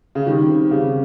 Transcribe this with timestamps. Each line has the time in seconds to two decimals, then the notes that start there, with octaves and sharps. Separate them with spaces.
0.15 C#3
0.26 D#3 G3
0.49 C4
0.71 C#3 G4